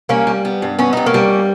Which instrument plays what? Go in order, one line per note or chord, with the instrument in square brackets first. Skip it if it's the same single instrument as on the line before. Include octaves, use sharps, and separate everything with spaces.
[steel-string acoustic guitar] G3 [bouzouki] A#3 C#4
[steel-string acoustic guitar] G3
B3
G2
[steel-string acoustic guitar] B3 [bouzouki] C#4
[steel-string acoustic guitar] G2 [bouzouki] D#4
[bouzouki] A#3 C#4
[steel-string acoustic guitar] G3